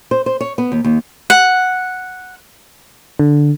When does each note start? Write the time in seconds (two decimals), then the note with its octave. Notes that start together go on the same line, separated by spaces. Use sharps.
0.11 C5
0.26 C5
0.41 C#5
0.58 B3
0.72 D#2
0.84 D#2
1.30 F#5
3.19 D3